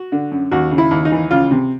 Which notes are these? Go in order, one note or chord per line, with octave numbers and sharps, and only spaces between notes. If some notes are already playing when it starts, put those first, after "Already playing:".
Already playing: F#4
D3
F#2
D#2 F#4
C#3
E4
D#2
D#4
E3
C#2 F4
C3